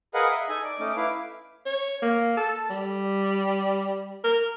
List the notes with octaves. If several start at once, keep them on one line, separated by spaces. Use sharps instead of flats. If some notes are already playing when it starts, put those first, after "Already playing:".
G#4 A#4 B4 D#5 F5 F#5
D#5 E5
D#4 A4 G#5
D5
A3 C#4 D#4 D6
E4 B4 F5 D6
C#5
A#3
A4
G3
A#4